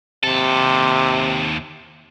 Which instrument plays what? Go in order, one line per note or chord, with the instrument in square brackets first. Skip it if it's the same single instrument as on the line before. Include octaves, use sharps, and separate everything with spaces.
[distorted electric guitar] D#2 A4 [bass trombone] C3